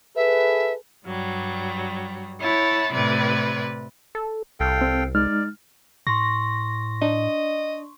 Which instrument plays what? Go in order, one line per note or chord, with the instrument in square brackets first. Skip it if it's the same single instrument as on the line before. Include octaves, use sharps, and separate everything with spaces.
[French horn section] G#4 A4 B4 [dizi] E5
[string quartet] G2 F#3 G3
E4 C#5 F#5 A5 B5
A2 C3 E4 B4 D5 G#6
[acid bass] A4
[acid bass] C2 [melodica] A4 F5 G5
[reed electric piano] C4
[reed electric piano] G#3 D#4 F6 [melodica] D5
[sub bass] A2 [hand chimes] C6 C#6 [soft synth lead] A#6
[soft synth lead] D4 [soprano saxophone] D#5